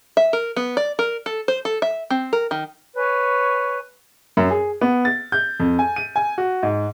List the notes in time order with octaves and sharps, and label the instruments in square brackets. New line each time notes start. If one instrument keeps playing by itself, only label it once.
[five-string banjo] E5
A#4
B3
D5
A#4
A4
C5
A4
E5
C4
A#4
D#3
[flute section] B4 C#5 G#5
[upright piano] F#2
G#4
B3
A6
G6
F2
G#5
D#7
G#5
F#4
G#2